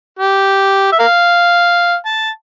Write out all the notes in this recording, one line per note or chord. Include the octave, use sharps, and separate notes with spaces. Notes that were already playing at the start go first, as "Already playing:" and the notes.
G4
E5
A#4 F5
A5